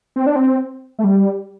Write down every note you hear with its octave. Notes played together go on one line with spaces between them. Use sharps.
C4
D4
C4
A3
G3